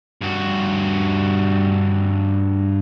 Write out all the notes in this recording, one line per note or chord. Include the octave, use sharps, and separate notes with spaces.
G2 F#4